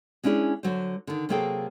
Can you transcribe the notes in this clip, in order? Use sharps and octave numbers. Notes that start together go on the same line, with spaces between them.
G#3 C#4 D4 E4 G#4
D3 F#3 C5
D3 D#3
C3 F#3 A#3 G#4 A4 G5